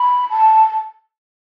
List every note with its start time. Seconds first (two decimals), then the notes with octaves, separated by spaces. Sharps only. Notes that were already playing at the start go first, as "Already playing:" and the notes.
Already playing: B5
0.30 A5